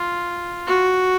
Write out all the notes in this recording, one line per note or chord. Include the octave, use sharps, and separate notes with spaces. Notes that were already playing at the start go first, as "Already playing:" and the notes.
Already playing: F4
F#4